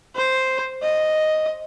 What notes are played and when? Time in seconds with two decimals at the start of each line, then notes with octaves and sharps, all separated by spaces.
0.16 C5
0.83 D#5